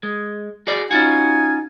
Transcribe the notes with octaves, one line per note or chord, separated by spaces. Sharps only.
G#3
F#4 G#4 D5
C#4 D#4 F4 F#4 G#5